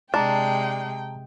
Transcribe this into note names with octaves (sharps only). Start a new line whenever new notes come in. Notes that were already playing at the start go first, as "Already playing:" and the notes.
C3 G#3 D4 G5 A5 A#5